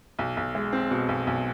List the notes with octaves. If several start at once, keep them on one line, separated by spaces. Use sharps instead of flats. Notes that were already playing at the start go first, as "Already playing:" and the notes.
B1
B1
G#3
C4
B2
B1
B1